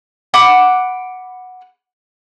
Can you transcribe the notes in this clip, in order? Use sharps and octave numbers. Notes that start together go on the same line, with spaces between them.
F#5 B5 D6